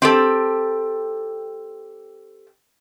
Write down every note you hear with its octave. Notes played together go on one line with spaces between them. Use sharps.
C4 G4 A4